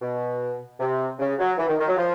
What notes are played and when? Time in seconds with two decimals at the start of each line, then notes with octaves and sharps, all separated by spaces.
0.02 B2
0.80 C3
1.19 C#3
1.39 F#3
1.58 E3
1.67 D#3
1.78 D#3
1.88 F#3
1.97 F3